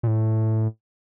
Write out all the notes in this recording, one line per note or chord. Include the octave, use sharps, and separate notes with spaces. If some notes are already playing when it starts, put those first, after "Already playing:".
A#2
A2